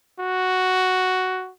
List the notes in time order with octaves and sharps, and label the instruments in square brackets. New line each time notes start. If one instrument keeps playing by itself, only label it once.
[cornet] F#4